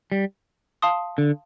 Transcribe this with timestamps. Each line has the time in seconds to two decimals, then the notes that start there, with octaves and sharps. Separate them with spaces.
0.12 G3
0.82 F5 A5 C6 D#6
1.18 D3